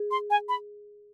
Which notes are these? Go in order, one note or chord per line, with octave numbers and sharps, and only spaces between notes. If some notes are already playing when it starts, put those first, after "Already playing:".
Already playing: G#4
C6
G#5
B5